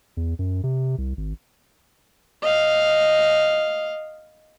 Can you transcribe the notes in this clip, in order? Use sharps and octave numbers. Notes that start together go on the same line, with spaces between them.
E2
F#2
C3
C2
G#1
D#5 F5